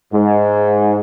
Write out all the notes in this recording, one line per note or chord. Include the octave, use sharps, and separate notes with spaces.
G#2